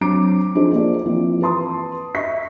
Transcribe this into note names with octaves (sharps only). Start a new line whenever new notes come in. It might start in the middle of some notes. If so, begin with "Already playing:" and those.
F#3 C4 D4 A#5 D6 D7
F3 D4 D#4 G#4 C5
A#3 F4 D5
E3 F3 A#3 C4
B4 A5 C6 D#6
D#5 E5 C#6 B6